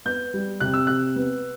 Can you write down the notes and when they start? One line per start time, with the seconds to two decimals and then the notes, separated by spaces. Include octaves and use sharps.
0.05 B3 G6
0.34 G3
0.60 C3 F#6
0.74 E6
0.87 C3 F#6
1.16 B3